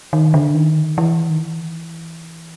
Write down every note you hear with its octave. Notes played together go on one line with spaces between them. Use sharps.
D#3
D3
D#3
E3
D#3
E3